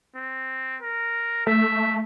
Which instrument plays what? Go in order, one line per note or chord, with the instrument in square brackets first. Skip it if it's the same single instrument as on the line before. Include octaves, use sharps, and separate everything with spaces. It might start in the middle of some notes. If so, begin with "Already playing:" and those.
[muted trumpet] C4
A#4
[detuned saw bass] A3 [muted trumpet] E5